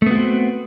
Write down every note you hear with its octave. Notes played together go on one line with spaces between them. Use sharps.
A3 B3 C4 F#4